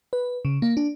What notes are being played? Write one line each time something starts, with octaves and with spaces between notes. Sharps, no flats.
B4
C#3
A#3
D4